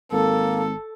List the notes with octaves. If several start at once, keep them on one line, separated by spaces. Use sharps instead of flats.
G#1 A#3 A4